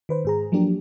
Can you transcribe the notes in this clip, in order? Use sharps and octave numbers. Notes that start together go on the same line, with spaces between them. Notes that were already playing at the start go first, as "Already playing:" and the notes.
D#3 B4 C5
G#2 G#4 A#5
F3 F#3 A#3 D4 G4